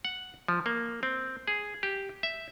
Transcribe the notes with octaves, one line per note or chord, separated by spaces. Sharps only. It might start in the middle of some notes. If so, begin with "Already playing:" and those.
F#5
F3
A#3
C4
G#4
G4
E5